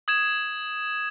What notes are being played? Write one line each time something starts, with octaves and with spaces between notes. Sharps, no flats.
D#6 G#6 E7